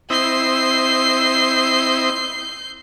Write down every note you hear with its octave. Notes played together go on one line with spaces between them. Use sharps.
C4 E4 D#5 G6 C7